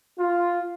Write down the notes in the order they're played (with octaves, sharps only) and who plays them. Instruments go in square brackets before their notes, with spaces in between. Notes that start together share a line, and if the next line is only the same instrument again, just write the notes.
[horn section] F4